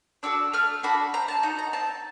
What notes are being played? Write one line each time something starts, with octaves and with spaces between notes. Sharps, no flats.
D4 F#4 A4 E6
A3 F6
D4 F#4 A4 B5
C4 A#5
A5
D#4 F#4 A#5
A#5
C4 A5